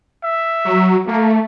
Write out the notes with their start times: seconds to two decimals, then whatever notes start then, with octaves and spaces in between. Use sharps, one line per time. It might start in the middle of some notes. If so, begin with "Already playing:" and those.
0.23 E5
0.65 F#3
1.07 A3 A#3